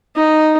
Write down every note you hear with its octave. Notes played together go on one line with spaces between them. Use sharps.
D#4